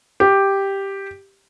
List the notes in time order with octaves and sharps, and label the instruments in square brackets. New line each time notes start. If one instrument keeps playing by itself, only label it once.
[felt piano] G4